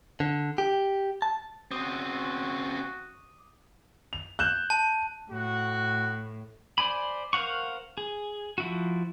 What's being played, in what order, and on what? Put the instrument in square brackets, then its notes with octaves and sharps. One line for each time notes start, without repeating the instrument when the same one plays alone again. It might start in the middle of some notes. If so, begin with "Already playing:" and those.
[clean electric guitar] D3
G4
A5
[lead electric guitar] C#3 C4 [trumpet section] F#4 [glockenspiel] D6 D#6 D#7
[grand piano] F7
F#6 G6 E7
[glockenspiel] A5
[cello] A2 [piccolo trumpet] F#4
[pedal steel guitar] C5 D5 G#5 B5
A#4 C5 F5 F#5 C#6
G#4
F3 E4 F#4